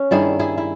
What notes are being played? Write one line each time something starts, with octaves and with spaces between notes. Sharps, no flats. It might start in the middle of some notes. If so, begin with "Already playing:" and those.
Already playing: C#4
G2 D#3 G3 E4 G#4
E4 G#4
E4